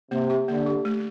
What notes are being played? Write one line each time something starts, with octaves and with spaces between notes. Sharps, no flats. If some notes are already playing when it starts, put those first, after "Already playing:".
C3 A#3
G4
D3 A#3
G4
A3